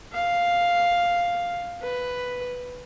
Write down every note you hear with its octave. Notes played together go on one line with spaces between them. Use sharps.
F5
B4